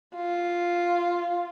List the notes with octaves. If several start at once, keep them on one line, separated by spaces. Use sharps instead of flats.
F4